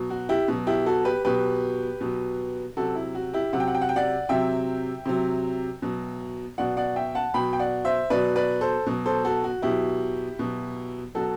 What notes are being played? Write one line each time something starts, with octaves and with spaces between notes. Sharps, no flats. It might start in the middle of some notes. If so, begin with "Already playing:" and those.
Already playing: B2 F#3
F#4
E4 G4
B2 F#3
E4 G4
F#4 A4
G4 B4
B2 F#3 G4 B4
B2 F#3
C3 F#3 F#4 A4
E4
F#4
E4 G4
C3 F#3 F#5
G5
F#5
G5
F#5
G5
D5 F#5
C3 F#3 E5 G5
C3 F#3
B2 F#3
B2 F#3 D5 F#5
D5 F#5
E5 G5
F#5 A5
B2 F#3 G5 B5
G5
D5 F#5
C5 E5
B2 F#3 B4 D5
B4 D5
A4 C5
B2 F#3
A4 C5
F#4 A4
F#4
B2 F#3 E4 G4
B2 F#3
B2 F#3 F#4 A4